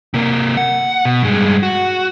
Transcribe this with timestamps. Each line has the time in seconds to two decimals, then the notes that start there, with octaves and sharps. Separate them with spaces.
0.14 C3 A#3
0.57 F#5
1.05 B2
1.23 G2 G#3
1.63 F#4